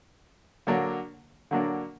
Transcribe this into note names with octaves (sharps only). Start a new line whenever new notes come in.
D3 F#3 A#3 D4
D3 F#3 A#3 D4